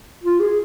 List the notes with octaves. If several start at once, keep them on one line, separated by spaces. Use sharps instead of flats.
F4
G#4